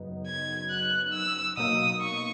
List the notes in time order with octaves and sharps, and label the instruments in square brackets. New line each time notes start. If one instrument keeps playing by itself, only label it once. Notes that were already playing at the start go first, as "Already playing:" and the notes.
Already playing: [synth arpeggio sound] F#2 C#3 F#3 B3 D#4
[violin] G#6
F#6
E6
[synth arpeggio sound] B2 F#3 A#3 D#4 [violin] D#6
[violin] C#6